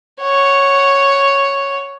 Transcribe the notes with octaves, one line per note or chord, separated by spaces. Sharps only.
C#5 F#5